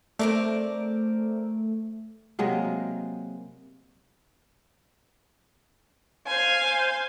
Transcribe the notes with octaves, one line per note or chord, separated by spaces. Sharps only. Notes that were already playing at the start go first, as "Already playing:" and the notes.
A3 C4 A#4 D5
C3 F#3 G#3 A#3
C5 F5 G#5